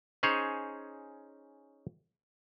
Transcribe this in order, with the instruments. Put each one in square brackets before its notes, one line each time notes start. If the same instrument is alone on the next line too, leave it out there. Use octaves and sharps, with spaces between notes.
[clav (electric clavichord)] C#4 D#4 G#4 C5 C#5